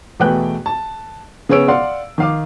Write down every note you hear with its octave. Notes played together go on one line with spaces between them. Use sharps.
E2 B2 A3 B4 G5 F#6
A5
C#3 B3 G#4 C#5 E6 D7
D5 F5 F#5 C6
D#3 F5 D6